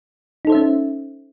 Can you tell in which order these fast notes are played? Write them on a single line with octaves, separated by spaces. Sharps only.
D#4 A4 C5 E5 C#4